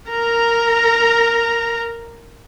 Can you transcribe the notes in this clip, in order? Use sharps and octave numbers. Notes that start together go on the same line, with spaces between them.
A#4 A#5